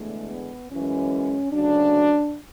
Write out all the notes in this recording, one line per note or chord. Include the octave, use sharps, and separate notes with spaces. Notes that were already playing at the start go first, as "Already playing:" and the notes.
Already playing: E2 D3 G#3 A3
B3
F#2 E3 G#3 C#4
D2 C#3 F#3 D4